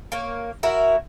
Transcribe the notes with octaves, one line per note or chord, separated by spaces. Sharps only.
A#3 C#5
E4 F#4 A#4 E5